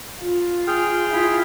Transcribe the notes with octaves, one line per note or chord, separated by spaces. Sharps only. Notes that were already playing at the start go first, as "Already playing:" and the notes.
F4
G#4 G5 F6
E4 F4